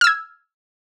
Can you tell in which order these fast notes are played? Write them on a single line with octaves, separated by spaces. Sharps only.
F6 E6 G#6